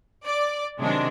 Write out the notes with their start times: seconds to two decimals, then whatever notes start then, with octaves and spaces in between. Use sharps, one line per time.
0.24 D5
0.79 C3 D#3 F#3 G#3 D4